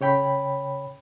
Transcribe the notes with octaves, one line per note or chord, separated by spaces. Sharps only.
C#3 C#5 G5 B5